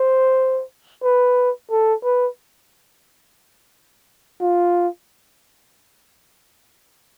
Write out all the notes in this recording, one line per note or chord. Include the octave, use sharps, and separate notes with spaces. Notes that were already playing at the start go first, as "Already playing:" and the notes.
Already playing: C5
B4
A4
B4
F4